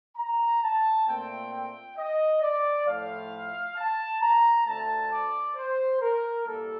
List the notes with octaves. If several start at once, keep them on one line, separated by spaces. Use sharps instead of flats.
A#5
A5
A#2 A3 C4 G5
G5
D#5
D5
A2 F3 A3 F5
A5
A#5
D2 D3 A3 C4 A5
D5
C5
A#4
C2 A#2 G3 A#3 A4